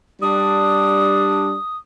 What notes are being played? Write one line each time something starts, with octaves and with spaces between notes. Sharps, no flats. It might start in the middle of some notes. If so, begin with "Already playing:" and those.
G3 D4 D#6